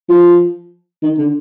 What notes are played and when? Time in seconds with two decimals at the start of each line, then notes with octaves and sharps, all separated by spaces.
0.09 F3
1.03 D#3
1.18 D3